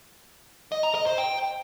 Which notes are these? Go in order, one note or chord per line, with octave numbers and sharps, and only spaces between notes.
D#5
A#5
D#5
C5
G5